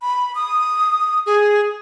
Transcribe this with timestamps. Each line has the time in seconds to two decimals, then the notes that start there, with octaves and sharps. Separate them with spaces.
0.02 B5
0.35 D#6
1.26 G#4